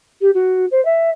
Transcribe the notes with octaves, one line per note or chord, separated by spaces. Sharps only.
G4
F#4
C5
E5